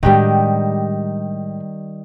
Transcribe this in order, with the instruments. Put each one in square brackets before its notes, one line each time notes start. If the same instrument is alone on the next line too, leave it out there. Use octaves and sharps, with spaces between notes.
[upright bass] A2 G#3 [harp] D#3 G3 [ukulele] D4 F#4 G4